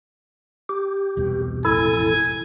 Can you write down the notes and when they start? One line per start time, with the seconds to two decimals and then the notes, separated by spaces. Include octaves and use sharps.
0.69 G4
1.17 E1 C2 B2
1.65 E1 A1 F2 E4 A4 G#5